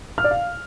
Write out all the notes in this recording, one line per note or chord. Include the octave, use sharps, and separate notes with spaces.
F6
D5
F5